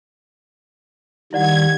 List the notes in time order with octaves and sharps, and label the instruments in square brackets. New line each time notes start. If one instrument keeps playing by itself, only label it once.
[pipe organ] D#3 G3 [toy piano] E4 D5 F#5 [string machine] G#6